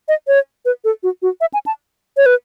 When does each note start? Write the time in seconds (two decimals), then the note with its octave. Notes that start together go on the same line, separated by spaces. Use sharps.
0.08 D#5
0.27 C#5
0.65 B4
0.84 A4
1.03 F#4
1.22 F#4
1.41 E5
1.54 G#5
1.66 A5
2.17 C#5
2.26 B4